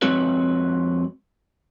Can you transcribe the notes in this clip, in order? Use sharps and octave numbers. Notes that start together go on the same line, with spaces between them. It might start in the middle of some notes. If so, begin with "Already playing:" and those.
F2 G#3 C4 F#4 B4 C#5